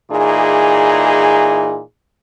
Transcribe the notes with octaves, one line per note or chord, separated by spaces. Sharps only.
A#2 E3 D#4 G#4